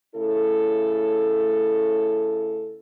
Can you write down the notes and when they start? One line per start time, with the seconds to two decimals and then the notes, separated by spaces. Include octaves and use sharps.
0.15 C#3 A3 E4 A4